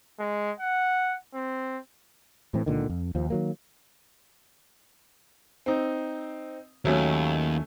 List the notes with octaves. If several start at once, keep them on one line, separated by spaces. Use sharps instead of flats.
G#3
F#5
C4
A2 E3 C4
C#2 A#2 D3 D#3
F2
D#2 F3
D#3 F#3 A#3
C4 D#4
D#2 F#3 A3 C#4